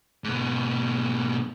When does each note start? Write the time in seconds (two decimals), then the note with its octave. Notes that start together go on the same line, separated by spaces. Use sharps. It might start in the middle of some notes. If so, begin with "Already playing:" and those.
0.24 G#2 B2